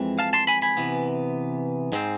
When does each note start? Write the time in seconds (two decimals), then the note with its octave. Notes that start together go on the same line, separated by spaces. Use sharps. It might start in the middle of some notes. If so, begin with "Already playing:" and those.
Already playing: F2 E3 G#3 C4
0.19 F5 A5
0.33 A5 C6
0.47 G#5 B5
0.62 G#5 B5
0.77 C3 E3 B3
1.92 G#2 G#3 C4